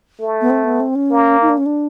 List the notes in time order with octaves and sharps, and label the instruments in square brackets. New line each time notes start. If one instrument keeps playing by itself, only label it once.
[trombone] A3
[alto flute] B3
C4
B3
C4
C#4
[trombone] A#3
[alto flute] D#4
D4
C#4
D4